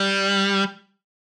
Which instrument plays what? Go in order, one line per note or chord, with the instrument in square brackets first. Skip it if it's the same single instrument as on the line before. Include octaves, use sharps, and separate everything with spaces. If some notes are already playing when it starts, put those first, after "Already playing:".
Already playing: [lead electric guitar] G3